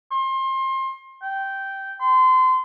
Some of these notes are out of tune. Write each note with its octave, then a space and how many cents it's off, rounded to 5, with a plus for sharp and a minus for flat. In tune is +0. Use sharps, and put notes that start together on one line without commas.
C6 +30
G5 -10
C6 -30